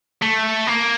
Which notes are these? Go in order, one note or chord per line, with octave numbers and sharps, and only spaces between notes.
A3
A#3